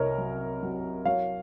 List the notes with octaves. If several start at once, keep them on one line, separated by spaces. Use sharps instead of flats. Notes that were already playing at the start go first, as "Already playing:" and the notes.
Already playing: C2 C3 A#4 C#5 D#5
F#3
F#3
F#3 C#5 F5